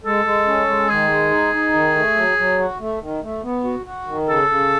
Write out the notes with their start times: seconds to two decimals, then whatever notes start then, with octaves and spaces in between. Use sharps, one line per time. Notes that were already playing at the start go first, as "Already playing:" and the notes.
0.04 G#3 A4
0.25 G#3
0.46 C#4
0.67 G#3
0.89 D#3 G#4
1.10 G#3
1.31 D#4
1.53 D#4
1.73 D#3
1.95 A3
2.16 F#3
2.38 F#3
2.59 F#4
2.80 A3
3.01 D#3
3.23 A3
3.43 B3
3.64 F#4
3.86 F#4
4.07 D#3
4.29 C#3 A4
4.49 C#3